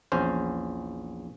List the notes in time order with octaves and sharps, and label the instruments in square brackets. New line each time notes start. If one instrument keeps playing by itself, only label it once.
[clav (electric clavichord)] A#1 E2 C#4 C5